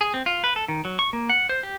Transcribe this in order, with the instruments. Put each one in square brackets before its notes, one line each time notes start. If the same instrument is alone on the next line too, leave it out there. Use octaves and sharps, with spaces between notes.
[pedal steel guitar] G#4
C4
F4
B4
A4
D#3
F#3
C#6
A#3
F#5
C5
G4